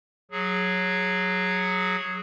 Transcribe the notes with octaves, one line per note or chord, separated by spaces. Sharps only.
F#3 G#4